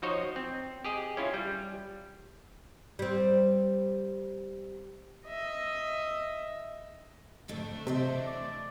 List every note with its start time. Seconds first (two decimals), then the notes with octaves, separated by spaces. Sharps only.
0.02 F3 D#4 F#4 C5 C#5 D#5
0.36 C4
0.85 G4 G#4 D#5
1.17 C#4 E4 F4
1.34 G3
2.99 G3 C4
5.26 D#5 E5
7.48 F2 G#2 D3 A3 D4
7.87 C3 E3 C5 D#5 E5
8.26 D5